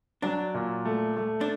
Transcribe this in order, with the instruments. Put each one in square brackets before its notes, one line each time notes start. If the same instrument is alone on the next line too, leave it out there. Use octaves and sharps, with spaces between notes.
[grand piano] F#3 [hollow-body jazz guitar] D4
[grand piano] A#2
A3
A3
[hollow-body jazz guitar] D4